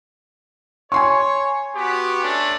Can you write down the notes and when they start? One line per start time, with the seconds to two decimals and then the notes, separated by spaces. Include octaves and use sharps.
0.92 C#5 G#5 C6 C#6
1.76 B3 F#4 G4
2.23 A3 C#4 D4